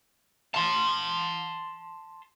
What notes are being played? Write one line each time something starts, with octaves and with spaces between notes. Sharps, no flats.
A5 C6